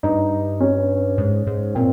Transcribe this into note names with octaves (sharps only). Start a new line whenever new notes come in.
G2 D#4
C#4
G#2
G#2
A#2 C4